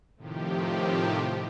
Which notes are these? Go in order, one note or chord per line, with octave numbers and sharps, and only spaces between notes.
A2 C3 D#3 F3 G4